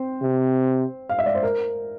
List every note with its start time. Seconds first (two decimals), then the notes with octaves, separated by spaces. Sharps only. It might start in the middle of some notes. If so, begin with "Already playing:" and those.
Already playing: C4 C5
0.22 C3
1.09 F5
1.19 E5
1.26 D5
1.35 C5
1.43 A#4